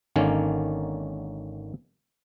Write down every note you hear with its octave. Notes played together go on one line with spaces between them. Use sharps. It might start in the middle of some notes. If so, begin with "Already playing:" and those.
G#1 D3 D#3 A#3 C#4 C#5